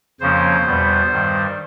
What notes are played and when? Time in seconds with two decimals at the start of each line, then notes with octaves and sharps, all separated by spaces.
0.20 F2 C#3 F3 A#3 C#4 C5
0.66 E2 B2 G3 B3
1.11 G2 D#3 G3